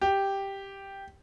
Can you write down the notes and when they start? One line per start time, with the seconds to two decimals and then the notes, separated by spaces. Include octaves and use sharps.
0.02 G4